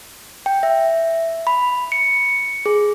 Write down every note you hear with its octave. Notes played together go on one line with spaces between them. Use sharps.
G5
E5
B5
C#7
G#4